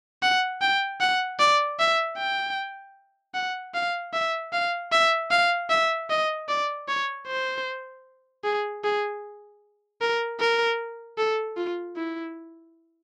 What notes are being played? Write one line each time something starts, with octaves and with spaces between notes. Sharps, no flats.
F#5
G5
F#5
D5
E5
G5
F#5
F5
E5
F5
E5
F5
E5
D#5
D5
C#5
C5
G#4
G#4
A#4
A#4
A4
F4
E4